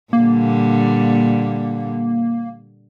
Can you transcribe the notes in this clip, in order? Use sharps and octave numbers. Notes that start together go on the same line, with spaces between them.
A#2 D3 G3 A#3